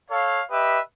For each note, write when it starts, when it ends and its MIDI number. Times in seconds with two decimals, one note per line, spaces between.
0.11 0.42 69
0.11 0.42 73
0.11 0.42 77
0.50 0.79 67
0.50 0.79 71
0.50 0.79 75
0.50 0.79 76